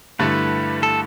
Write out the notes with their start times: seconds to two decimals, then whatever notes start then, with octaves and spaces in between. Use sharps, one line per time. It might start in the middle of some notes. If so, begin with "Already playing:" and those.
0.19 G2 D3 A3 E4 B4
0.83 A4